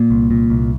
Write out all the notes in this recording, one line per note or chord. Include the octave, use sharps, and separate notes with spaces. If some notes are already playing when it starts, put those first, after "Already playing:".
Already playing: A#2 A#3
C2
A#2
C2